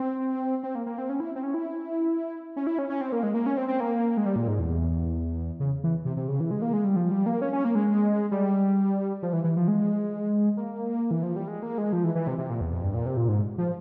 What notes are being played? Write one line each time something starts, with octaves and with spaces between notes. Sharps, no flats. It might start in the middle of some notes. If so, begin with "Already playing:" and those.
Already playing: C4
C4
A#3
A#3
C4
C#4
E4
C4
C#4
E4
C#4
E4
C#4
C#4
C4
A#3
G#3
A#3
C#4
C4
C4
A#3
G#3
G3
A#2
G#2
E2
C#3
E3
C3
C3
C#3
E3
G#3
A#3
G#3
G3
F3
G3
A#3
C#4
C#4
A#3
G#3
G3
F3
E3
E3
F3
G#3
A#3
E3
F3
G3
G#3
A#3
G#3
F3
E3
E3
C3
C3
A#2
E2
F2
G2
A#2
C3
A#2
G#2
F3